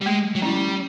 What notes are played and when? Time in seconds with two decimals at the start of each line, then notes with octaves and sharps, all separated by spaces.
0.01 G3
0.06 G#3 A3
0.35 F#3
0.42 G3 C#4 E4